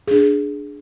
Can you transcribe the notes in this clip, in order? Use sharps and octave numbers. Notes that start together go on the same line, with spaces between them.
D4 G#4